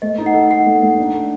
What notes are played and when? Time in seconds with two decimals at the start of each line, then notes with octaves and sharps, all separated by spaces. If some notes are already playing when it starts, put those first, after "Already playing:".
0.02 A3 D#5
0.18 D#4
0.26 F#5
0.34 A4
0.50 A4 F#5
0.66 A3
0.82 A3
0.98 D4
1.14 A4